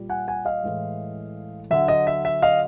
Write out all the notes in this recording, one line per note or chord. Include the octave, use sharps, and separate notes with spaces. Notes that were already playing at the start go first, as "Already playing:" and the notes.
Already playing: A#2 G3
F#5 G#5
F#5 G#5
D#5 F5
A2 E3 G#3
D3 F#3 E5
D#5
E5
E5
D#5 F5